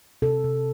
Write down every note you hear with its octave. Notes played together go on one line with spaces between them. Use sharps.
C3 A4
C3